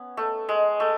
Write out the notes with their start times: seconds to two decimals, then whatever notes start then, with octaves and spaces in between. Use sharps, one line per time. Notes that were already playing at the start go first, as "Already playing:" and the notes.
Already playing: B3 C#4
0.17 A3
0.49 G#3
0.80 A3